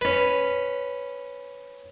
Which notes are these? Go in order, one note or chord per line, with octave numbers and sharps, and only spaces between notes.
C#4 B4